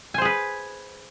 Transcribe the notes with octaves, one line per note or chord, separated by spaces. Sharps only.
G#4 B4 C5 G#5